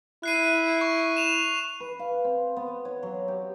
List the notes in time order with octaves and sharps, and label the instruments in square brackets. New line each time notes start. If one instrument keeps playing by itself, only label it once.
[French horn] E4 [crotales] F#6 C7 D#7
[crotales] C#6
E7 F7
[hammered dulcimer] B4
F5
C4
B3
C#5
F#3
G4